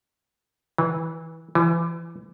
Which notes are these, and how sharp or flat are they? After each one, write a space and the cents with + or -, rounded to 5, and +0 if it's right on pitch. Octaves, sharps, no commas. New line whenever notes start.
E3 -20
E3 +30